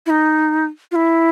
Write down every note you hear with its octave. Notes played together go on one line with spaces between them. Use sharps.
E4
D#4
F4
E4